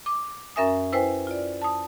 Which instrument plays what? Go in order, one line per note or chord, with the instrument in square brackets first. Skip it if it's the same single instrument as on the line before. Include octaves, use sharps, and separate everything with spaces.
[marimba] D6
F#2 C#4 A#4 E5 G#5 D#6
E4 B4 C5 G5 G#5
F4 D5
A5 D#6